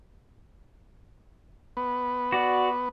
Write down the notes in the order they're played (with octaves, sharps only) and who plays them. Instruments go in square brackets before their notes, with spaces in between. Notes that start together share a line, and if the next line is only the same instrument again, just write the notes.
[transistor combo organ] B3
[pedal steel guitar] F#4 D5